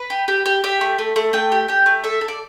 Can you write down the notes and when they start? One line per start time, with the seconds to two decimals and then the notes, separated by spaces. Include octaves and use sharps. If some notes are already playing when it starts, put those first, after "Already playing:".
Already playing: B4
0.10 G4
0.28 G4
0.46 G4
0.64 G4 E5
0.81 A3
0.99 A3
1.16 A3
1.33 A3 G5
1.52 G4
1.68 G4 G5
1.86 A3
2.04 A4 E5
2.21 A4
2.28 D5